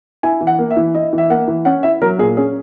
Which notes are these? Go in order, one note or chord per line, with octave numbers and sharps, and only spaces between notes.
E4 G#5
E3
F#5
A#3
E5
E3
E4 D#5
E3
E5
A#3 F#5
E3
C#4 F#5
E4 E5
F#3 A#4
A#2 G#4
C#4 G#4